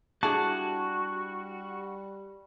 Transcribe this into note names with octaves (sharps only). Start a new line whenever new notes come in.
G3 D4 E4 F#4 G#4 A5